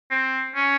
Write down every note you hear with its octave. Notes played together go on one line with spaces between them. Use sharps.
C4
C#4